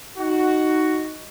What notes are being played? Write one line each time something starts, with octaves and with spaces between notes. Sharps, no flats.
D#4 F#4